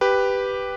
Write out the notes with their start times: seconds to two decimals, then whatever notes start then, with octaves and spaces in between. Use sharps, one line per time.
0.01 G4 B4